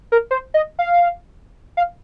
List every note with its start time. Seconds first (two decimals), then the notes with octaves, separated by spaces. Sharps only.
0.12 A#4
0.31 C5
0.54 D#5
0.79 F5
1.77 F5